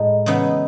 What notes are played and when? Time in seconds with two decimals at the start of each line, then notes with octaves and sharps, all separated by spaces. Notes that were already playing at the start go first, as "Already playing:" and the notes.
Already playing: A2 G#3 D#4
0.26 C#3 E3 B3 D#4